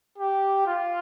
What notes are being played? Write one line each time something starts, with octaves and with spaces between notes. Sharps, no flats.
G4
F4